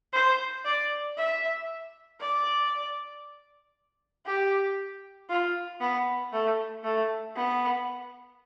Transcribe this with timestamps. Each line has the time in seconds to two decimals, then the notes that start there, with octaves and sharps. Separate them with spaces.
0.13 C5
0.65 D5
1.17 E5
2.20 D5
4.26 G4
5.30 F4
5.80 B3
6.33 A3
6.84 A3
7.36 B3